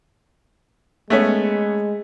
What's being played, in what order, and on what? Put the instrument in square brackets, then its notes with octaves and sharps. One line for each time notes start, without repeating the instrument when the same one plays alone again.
[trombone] G#3 [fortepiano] A3 B3 C#4